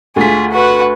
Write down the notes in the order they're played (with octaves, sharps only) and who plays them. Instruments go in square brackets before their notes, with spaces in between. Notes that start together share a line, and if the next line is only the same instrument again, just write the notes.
[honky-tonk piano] D2 B6 [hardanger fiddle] F4 G#4
[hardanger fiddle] F#4 B4